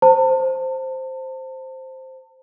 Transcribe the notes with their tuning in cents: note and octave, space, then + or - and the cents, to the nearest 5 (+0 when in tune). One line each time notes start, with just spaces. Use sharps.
C5 +0 A5 +35